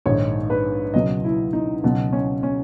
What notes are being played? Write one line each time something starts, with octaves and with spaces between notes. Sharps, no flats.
A#1 G#2 D#3 C#5
B4
C#2 B2 F#3 D#5
E4
D#4
C#2 B2 F#3
C#4
C#4